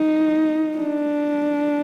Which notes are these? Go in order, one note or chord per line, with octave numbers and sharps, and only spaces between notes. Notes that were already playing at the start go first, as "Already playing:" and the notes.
Already playing: D#4
D4